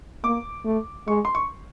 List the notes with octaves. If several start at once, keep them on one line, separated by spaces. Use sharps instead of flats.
A#3 D6
A3
G#3 C#6
C6
C#6